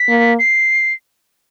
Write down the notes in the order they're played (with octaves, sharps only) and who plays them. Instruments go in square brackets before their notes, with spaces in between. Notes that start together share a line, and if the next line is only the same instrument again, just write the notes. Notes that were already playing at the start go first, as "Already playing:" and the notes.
Already playing: [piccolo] B6
[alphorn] A#3
[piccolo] C7